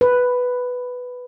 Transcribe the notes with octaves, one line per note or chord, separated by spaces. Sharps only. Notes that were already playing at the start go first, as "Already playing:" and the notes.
B4